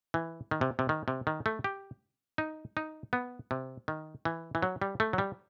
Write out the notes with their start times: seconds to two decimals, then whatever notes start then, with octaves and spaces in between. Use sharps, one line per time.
0.14 E3
0.51 D#3
0.61 C3
0.79 C3
0.89 D#3
1.08 C3
1.27 D#3
1.46 A3
1.64 G4
2.38 D#4
2.77 D#4
3.13 B3
3.51 C3
3.88 D#3
4.25 E3
4.55 E3
4.62 F#3
4.82 G3
5.00 A3
5.13 F#3
5.18 G3